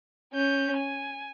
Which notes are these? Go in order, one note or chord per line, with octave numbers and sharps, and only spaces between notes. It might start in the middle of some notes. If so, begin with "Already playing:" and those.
C#4 G6
G#5